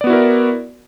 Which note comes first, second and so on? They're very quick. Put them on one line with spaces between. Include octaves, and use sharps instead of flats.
D5 B3 F#4 E4 A#4